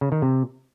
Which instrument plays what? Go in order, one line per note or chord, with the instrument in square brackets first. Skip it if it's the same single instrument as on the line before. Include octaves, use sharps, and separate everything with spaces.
[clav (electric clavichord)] C#3
D#3
C3